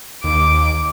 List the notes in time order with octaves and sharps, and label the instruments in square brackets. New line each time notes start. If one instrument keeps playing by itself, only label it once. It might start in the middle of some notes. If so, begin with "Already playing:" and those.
[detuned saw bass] D#2 [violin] D6